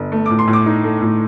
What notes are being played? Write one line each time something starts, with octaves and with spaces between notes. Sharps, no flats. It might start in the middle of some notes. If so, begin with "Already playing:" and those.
Already playing: G1
A3
A2 D6
C6
A2
D6
D#4
A3
A2